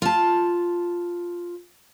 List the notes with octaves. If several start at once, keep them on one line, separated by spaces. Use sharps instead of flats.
F4 A5